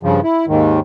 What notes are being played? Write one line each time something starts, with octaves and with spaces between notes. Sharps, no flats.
G2 C#3 F3
E4
D#2 G#2 D#3